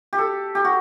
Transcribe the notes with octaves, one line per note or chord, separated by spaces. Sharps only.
G4
A4
G4
F#4